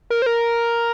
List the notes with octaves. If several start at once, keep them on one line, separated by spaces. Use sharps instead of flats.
A#4
C5
A#4